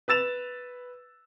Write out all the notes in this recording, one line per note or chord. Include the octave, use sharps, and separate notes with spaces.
B4 E6 A6 E7 F7